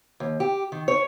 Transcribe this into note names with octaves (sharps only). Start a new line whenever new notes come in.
D#2
G4
D#3
C#5